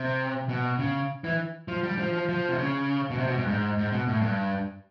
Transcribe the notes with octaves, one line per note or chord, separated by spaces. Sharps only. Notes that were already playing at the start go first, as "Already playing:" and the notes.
Already playing: C3
B2
C#3
E3
F3
G3
F3
F3
F3
C3
C#3
B2
C3
B2
G2
G#2
G#2
B2
A2
G2